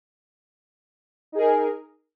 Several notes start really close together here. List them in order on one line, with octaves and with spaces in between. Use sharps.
D#4 G#4 A#4